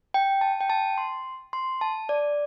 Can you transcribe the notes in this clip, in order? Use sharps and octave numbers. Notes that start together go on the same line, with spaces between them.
G5
A5
G5
A5
C6
C6
A5
D5